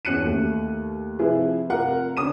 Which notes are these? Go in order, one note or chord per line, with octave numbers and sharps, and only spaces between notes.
E2 C#4 F#4 F#6 C#7 D#7
D#2 A3
C3 F3 E4 F4 G#4 B4
F1 F4 A#4 F5 F#5
D3 C#4 D#6 D#7